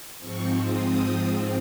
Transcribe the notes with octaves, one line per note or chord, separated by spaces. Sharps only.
G#2 F3 C4 C#6
D#6